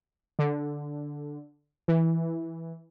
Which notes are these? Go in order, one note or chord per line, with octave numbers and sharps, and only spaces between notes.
D3
E3